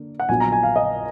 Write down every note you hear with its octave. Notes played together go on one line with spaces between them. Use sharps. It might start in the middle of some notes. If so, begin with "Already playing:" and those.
Already playing: D3 A#3
F#5
A#1 A#2 F#3 B3 G#5
A#5
G#5
F5
D#5